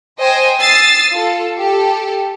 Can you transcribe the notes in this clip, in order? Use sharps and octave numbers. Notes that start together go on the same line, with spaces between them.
C5 D#5 G5 G#5
D#6 E6 A6 C7
F4 A4
G4 A4